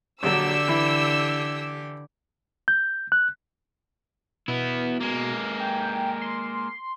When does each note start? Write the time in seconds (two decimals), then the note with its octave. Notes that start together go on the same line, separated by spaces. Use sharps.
0.23 A#1 D3 F#3 G4 E6
0.68 E3 E4
2.68 G6
3.12 F#6
4.48 B2 B3 E4
5.01 G#3 A#3
5.60 G5
6.21 C6